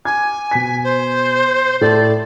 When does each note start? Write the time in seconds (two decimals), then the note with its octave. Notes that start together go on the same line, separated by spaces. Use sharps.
0.05 G#5 D6 G#6
0.51 B2 B6
0.84 C5
1.81 A2 A4 D5